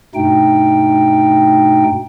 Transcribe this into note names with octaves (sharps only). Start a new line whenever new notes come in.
G2 B2 A3 D#4 G5